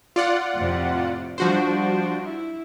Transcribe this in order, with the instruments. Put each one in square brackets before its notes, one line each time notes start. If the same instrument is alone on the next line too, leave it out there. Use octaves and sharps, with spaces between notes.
[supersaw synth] F4 D5 F#5
[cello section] F2 A2 C3
[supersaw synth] F3 F#4 C5 [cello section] G3 D4
[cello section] E4